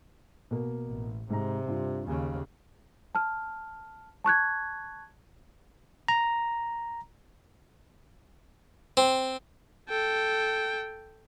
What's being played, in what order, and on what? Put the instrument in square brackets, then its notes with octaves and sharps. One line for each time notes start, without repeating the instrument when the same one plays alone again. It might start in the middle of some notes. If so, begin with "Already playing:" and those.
[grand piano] B2 A#3
[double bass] A1
[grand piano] G#2 A#5 [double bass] C3
[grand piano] G2 F4
[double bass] D#2 C#3 [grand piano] G#5
[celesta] A5 F6
A5 C#6 F#6 G#6
[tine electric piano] A#5
[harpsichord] C4
[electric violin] A4 G5